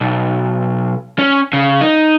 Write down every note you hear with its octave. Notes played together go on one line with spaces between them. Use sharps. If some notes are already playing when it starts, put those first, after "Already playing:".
B1
C#4
C#3
D#4